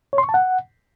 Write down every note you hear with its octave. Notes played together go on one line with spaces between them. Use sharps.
C#5
C6
C#6
A5
F#5